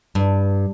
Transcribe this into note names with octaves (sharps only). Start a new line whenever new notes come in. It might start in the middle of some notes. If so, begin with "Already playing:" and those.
G2